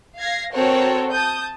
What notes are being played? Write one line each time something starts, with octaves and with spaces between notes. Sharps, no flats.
F5 G#6 A#6 C7
C4 F#4 A4 A#4 C#5
A5 D#6 G6